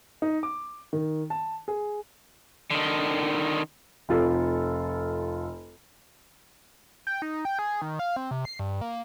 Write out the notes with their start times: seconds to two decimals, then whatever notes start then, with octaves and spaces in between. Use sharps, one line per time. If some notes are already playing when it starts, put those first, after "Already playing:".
0.22 D#4
0.43 D6
0.93 D#3
1.30 A5
1.68 G#4
2.71 D3 D#3
4.09 F1 F4 A4
7.07 G5
7.22 D#4
7.45 G5
7.59 G#4
7.82 D#3
7.99 F5
8.16 C4
8.31 C3
8.45 C7
8.59 G2
8.81 A#3